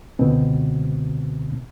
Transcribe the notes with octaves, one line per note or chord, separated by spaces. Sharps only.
C#2 B2 D3 C4